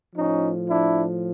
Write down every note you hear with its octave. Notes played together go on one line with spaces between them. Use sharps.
A2 F3 C#4 D#4
D4 E4